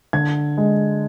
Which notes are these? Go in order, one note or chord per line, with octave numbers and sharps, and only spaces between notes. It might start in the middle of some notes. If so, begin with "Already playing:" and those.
D3 G#6
G#3